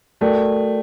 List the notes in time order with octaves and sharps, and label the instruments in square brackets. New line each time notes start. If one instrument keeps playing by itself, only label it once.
[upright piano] A3 [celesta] F#4 A#4 D5 G5